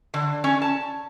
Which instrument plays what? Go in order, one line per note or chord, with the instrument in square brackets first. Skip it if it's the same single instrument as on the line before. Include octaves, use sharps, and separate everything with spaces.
[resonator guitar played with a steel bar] D3
C#4
A5